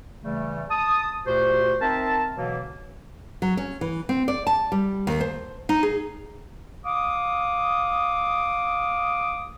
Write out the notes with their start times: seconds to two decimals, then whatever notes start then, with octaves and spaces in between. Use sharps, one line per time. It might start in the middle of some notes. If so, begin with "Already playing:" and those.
0.24 C#3 E3 G3 A3
0.70 A5 D#6
1.25 D2 A#2 F#4 G4 C5
1.80 C4 D#4 A#4 E5 A5
2.36 B2 D3 E3 F#3 A#3
3.42 F#3
3.57 C#4
3.81 E3
4.09 C4
4.28 D5
4.47 A5
4.72 G3
5.07 D#2
5.21 C5
5.69 D#4
5.83 G#4
6.85 F5 D6 D#6